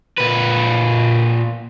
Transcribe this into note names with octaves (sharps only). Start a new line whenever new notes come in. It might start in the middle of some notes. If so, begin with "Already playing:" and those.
A#2 B4